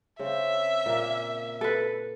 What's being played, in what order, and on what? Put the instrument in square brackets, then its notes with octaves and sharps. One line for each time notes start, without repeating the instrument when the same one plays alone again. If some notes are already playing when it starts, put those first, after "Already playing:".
[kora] C#3 C4 [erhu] E5
[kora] A#2 A#3
[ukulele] A4 B4